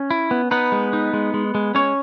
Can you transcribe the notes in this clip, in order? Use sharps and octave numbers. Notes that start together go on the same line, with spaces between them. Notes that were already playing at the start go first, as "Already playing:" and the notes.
Already playing: C#4
E4
B3
B3 D#4 B4
G#3
D#4
G#3
G#3
G#3
G#3 C#4 C#5